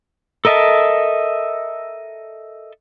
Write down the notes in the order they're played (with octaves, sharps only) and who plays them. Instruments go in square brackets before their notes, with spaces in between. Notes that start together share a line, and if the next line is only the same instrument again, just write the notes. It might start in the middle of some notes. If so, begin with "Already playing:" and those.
[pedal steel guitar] A4 A#4 D#5 E5 A5